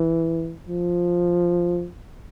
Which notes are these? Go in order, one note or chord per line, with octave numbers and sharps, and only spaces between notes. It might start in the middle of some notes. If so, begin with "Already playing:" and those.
Already playing: E3
F3